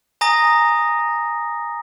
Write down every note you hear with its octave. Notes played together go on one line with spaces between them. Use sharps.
G#5 A#5 D#6 A#6